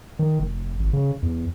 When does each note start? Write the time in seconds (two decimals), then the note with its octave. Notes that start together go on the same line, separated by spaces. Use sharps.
0.19 D#3
0.39 F1
0.79 G#1
0.93 C#3
1.22 E2